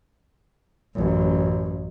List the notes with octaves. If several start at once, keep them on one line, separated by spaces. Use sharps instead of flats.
A1 F#2